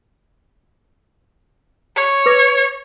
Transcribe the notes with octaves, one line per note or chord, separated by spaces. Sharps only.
C#5
B4 D6 A#6